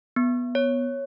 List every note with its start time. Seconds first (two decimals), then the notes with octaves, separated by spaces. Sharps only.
0.16 B3
0.55 C#5